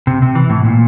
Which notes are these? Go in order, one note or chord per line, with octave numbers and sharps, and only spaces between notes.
C3
C3
E3
A2
A#2